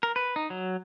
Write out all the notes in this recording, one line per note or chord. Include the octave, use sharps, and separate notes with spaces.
A#4
B4
D#4
F#3